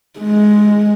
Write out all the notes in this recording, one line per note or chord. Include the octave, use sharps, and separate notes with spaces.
G#3